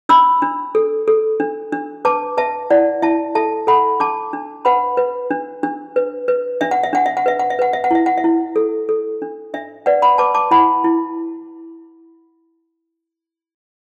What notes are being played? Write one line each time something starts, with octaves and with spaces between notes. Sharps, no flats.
D4 B5 E6
D4
A4
A4
D4
D4
B4 A5 D6
B4 E5 A5
E4 D5 F#5
E4 E5 A5
A4 E5 A5
A4 F#5 B5
D4 A5 D6
D4
B4 F#5 B5
B4
D4
D4
B4
B4
D4 E5
F#5
E5
D4 F#5
E5
F#5
B4 E5
F#5
E5
B4 F#5
E5
F#5
E4 E5
F#5
E5
E4
A4
A4
D4
D4 E5
B4 D5 F#5
F#5 B5
B4 A5 D6
A5 D6
E4 F#5 B5
E4